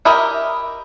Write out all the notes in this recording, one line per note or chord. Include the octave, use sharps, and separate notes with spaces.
E4 G4 A#4 D#5